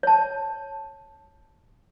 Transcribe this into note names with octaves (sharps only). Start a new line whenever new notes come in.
C#5 A5